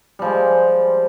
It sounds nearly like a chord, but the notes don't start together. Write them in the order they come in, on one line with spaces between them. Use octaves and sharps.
G3 F3 G#3